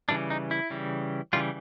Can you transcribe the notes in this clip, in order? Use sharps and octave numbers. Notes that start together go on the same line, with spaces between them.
C#3 E3 G3 D4
D#4
E4
C#3 E3 G3
C#3 E3 G3 F4